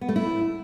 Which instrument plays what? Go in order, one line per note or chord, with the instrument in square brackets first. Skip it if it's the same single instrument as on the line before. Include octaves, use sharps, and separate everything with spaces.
[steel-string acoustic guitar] B3
A3
E4